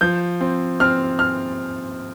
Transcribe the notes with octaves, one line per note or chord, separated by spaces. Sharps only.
F3 G6
C4
C4 F6
F6